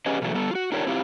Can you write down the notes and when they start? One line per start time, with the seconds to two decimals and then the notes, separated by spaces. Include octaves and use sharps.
0.06 C#4 G4 G#4 B4 D#5
0.22 B2 E3 F#3 A3
0.34 G3 B3 A4
0.51 F4 F#4
0.72 D4 D#4 F4 G4 A#4 C#5
0.87 C4 E4 F4 G4